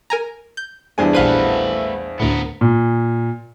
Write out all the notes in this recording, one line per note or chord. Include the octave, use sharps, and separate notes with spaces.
A#4 G#5 A#5
G6
E2 G2 D4 G#4 C5 G#5
A#1 A3 B4 C5 F5 F#5 B5 D#7
D2 A2 B3 A#4
A#2